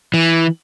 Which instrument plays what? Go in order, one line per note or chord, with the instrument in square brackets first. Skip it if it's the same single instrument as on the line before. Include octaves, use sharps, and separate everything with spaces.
[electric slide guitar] E3